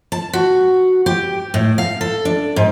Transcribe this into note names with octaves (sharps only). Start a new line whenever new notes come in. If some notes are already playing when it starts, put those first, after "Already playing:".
A5
F#4
G4
A2
F5
A4
D4
G#2